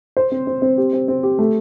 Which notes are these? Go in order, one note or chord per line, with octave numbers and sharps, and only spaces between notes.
C5
C4
C4
C4
G4
C4
C4
G4
A3